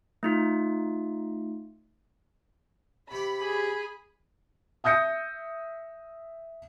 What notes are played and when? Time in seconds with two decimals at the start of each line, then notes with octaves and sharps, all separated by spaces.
0.23 A3 D#4 F4
3.11 C3 G4 B5
3.41 G#4
4.84 E5 D#6 G6 A#6 C#7